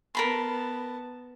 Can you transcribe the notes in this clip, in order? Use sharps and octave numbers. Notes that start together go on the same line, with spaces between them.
B3 A#4 A5 B5 C6